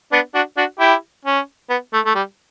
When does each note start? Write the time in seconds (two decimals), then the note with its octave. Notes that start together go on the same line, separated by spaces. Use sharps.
0.12 B3 D4
0.34 D4 F#4
0.57 D4 F#4
0.80 E4 G4
1.25 C#4
1.70 B3
1.93 A3
2.06 A3
2.15 G3